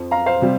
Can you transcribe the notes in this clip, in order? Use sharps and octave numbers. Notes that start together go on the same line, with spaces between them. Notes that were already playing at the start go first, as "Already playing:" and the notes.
Already playing: F2 F3
F5 A#5
C5 F5
C3 G3